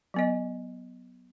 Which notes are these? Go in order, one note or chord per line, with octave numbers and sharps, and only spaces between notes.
F#3 B3 D#5